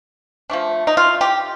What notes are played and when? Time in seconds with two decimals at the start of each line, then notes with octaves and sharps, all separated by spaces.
0.50 F3 A3 D4
0.87 D#4
0.97 F4
1.21 G4